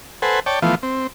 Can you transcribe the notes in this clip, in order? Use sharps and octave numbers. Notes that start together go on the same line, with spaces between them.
A4 B4 C5 F#5 G#5
C#5 D5 G5 A5
E3 F3 A3 B3 F4
C4